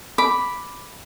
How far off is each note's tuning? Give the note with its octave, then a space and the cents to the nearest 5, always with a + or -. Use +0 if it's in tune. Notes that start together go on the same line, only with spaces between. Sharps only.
B5 +0 D6 +0